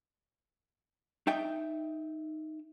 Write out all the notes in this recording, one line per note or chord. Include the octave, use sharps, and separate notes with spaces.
D#4 E5 G5